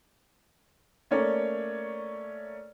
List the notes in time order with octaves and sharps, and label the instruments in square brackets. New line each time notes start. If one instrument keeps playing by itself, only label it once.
[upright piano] A3 A#3 C#4 C#5 D5